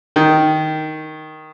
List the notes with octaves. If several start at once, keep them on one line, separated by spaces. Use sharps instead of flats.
D#3